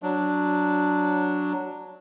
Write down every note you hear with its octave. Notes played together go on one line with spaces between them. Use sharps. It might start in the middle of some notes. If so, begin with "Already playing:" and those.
F#3 D4